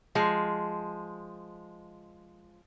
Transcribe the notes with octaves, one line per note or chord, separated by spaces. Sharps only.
F3 G#3